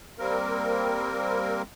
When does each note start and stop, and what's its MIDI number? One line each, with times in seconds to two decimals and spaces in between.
0.19 1.62 55
0.19 1.62 58
0.19 1.62 60
0.19 1.62 70